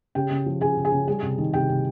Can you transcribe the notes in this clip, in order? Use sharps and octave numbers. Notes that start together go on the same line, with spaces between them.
C#3 G4 G5
C#3
F3
C#3 G#4 G#5
C#3
G#4 G#5
C#3
G3 G#4 G#5
C3
D#3
C3 G4 G5
C3